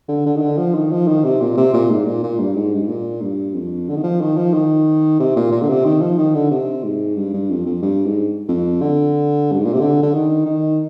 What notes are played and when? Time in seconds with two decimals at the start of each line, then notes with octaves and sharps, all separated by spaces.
0.08 D3
0.26 D3
0.36 D#3
0.41 D3
0.58 F3
0.75 D#3
0.92 F3
1.08 D#3
1.24 C3
1.41 A#2
1.57 C3
1.74 A#2
1.91 G#2
2.07 A#2
2.23 A#2
2.39 G2
2.55 G#2
2.74 G2
2.81 G#2
2.89 A#2
3.22 G2
3.54 F2
3.89 D3
3.97 D#3
4.04 F3
4.21 D#3
4.37 F3
4.54 D#3
5.20 C3
5.36 A#2
5.52 A#2
5.61 D3
5.69 C3
5.85 D#3
6.02 F3
6.18 D#3
6.35 D3
6.51 C3
6.84 G#2
7.16 G2
7.33 G2
7.50 F2
7.66 F2
7.82 G2
8.05 G#2
8.49 F2
8.81 D3
9.52 G2
9.59 G#2
9.66 A#2
9.73 C3
9.80 D3
10.03 D3
10.14 D#3
10.46 D#3